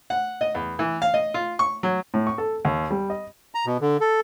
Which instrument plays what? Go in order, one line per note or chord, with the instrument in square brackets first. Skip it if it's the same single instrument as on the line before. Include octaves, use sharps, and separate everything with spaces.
[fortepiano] F#5
D#5
E2
E3
F5
D#5
F4
C#6
F#3
A2
C#6
A4
D#2
G3
D#5
[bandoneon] A#5
B2
D3
A4